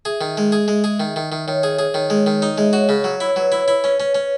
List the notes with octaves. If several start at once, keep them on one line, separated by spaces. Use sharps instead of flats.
G#4 E5
D#3
G#3
G#4
G#3
G#4
D#3 E5
D#3
D#3
D#3 C#5
G#4
G#4
D#3
G#3
D#3
D#4 D#5
G#3 E5
F#4 C#5
C#3
F#3
E4
C#5
F#3 B4
E4
C#5
E4
C#4
C#4
C#4